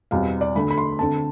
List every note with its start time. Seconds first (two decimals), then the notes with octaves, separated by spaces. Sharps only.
0.11 E2 B2 G3 C4 F5
0.41 D5
0.55 D2 D3 A3 D4 B5
0.71 B5
0.78 C6
0.99 D2 D3 A3 C4 A5